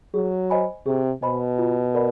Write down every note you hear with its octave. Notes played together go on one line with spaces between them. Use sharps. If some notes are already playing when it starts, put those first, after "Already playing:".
F#3 G#4
C5 D#5 G#5 B5
C3 G#4
B2 C5 D#5 G#5 B5
F4
A#4 D5 F#5 B5